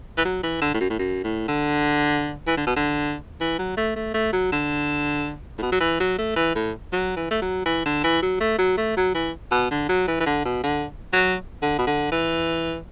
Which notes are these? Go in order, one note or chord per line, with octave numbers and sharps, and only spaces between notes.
E3
F#3
E3
D3
A2
F#2
A2
F#2
A2
D3
E3
D3
B2
D3
E3
F#3
A3
A3
A3
F#3
D3
A2
B2
F#3
E3
F#3
A3
E3
A2
F#3
E3
A3
F#3
E3
D3
E3
F#3
A3
F#3
A3
F#3
E3
B2
D3
F#3
E3
E3
D3
B2
D3
F#3
D3
B2
D3
E3